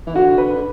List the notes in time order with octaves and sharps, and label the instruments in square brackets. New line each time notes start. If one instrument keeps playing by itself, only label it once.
[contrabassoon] E3
[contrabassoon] D3 [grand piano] F#4
[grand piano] B4
[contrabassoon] D3